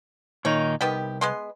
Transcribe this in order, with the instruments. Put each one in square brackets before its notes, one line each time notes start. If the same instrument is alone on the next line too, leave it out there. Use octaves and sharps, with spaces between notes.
[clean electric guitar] A#2 D#3 D#4 [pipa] C#5
[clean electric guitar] C2 [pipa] D#3 B3 G4
[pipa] G#3 B3 C6